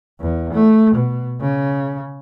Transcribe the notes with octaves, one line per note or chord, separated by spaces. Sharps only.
E2
A3
B2
C#3